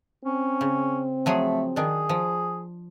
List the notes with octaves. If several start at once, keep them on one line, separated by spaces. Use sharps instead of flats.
C4 C#4
C#3
F3 F#3 A3 G#4
D#3 D4 G#4
F3